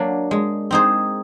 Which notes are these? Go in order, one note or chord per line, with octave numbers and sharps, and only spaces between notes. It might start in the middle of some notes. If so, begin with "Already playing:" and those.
Already playing: F#3 A#3 D4
G#3
C4 D#4 G#4 C5